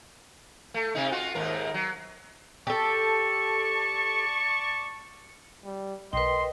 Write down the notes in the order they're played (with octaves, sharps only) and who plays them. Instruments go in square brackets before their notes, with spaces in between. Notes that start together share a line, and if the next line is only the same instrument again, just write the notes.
[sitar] A3
C3 D#4
F4 F#4
D#2 G#2 A#4
F#3
[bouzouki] G4 A4 [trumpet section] D5 A5 C#6
[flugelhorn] G3
[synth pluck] B1 A#4 [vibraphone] B4 G5 [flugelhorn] D#5 [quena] C6